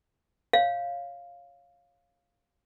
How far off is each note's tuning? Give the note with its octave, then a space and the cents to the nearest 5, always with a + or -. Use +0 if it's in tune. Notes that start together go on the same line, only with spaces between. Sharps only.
C#5 +0 F5 +0